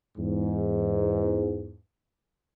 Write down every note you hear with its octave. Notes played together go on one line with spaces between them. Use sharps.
E2 G#2